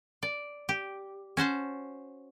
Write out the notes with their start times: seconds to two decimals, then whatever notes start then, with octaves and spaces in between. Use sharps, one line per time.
0.23 D5
0.69 G4
1.37 C#4 F#4 C5 A5